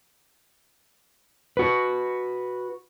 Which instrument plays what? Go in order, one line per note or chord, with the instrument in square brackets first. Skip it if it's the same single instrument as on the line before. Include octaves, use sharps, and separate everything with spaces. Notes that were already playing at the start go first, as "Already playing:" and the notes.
[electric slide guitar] F#4 B4